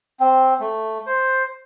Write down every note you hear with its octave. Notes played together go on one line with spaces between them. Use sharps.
C4
A3
C5